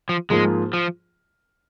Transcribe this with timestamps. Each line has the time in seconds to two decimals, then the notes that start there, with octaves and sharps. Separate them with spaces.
0.09 F3
0.30 G#2 F3 G#3 A#3 F4 G#4
0.73 F3